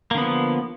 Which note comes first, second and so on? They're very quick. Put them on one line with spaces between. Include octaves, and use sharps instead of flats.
A#3 D3 B3 F3